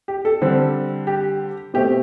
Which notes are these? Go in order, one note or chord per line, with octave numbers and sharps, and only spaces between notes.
G4
A4
D3 G3 C4
G4
B2 A3 C4 G4